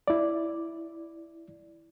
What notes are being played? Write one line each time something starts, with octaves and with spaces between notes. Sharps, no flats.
E4 D5